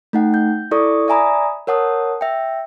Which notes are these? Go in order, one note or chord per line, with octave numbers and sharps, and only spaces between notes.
A3 D#4 F#5 G5
G6
E4 A4 D5 C#6 D#6
D5 E5 G#5 A#5 B5 D#6
A#4 C#5 F#5 A5 D#6
E5 G5